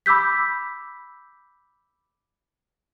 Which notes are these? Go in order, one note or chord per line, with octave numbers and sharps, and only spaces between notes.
B5 D6 E6 G6 B6